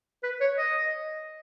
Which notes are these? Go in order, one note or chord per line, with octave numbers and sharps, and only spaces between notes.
B4
C#5
D#5